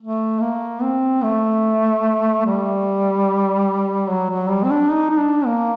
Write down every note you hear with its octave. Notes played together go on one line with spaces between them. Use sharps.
A3
A#3
C4
A3
G3
F#3
F#3
G3
C4
D4
D#4
D#4
D4
A#3